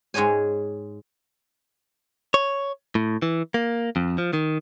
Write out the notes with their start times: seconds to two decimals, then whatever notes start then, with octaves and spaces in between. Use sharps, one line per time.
0.14 G#2 G#3 G#4 C#5 G#5
2.34 C#5
2.95 A2
3.22 E3
3.54 A#3
3.96 F2
4.18 F3
4.33 D#3